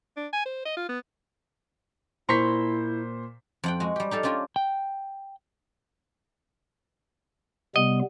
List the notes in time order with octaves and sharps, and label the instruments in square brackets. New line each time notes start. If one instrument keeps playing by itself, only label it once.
[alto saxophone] D4
G#5
C5
D#5
F4
B3
[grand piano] A#2 C5 B6 [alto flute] E4 [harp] A#5 C6 C#6
[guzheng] F2 F#5 G5
G#3 F#4
G3 G4
D#4 G4 A4 F5
C#4 D4 F4 G4 A#4
[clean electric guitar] G5
[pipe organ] C3 G3 B3 [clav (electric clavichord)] D#5